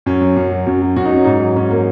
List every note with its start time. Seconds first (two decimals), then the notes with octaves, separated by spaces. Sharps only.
0.06 F#2 C#4
0.21 F#3
0.36 F#2
0.52 F#3
0.66 F#2
0.82 F#3
0.96 F#2 F#4
1.05 D#4
1.12 F#3 C#4
1.24 G#2 D#4
1.40 F#3
1.56 G#2 C#4
1.70 F#3 A#3